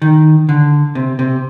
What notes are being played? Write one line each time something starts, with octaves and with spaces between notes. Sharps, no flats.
D#3
D3
C3
C3